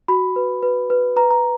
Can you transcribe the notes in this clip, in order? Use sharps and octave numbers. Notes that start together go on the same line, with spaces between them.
F#4 B5
B4
B4
B4
B4 A#5
A#5